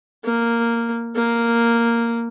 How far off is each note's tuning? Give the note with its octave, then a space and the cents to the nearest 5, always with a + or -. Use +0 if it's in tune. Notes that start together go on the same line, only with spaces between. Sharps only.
A#3 -5
A#3 -5